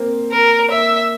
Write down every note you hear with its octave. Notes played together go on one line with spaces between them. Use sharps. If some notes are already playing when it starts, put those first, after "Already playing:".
Already playing: A#3 C4
A#4
A#3 E5